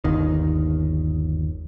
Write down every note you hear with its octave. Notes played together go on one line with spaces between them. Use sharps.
G1 D#2 D#3